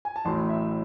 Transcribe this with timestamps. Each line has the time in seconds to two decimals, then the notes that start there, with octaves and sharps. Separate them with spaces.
0.05 G#5
0.16 A5
0.25 A1 A2 F#3 C6
0.49 E5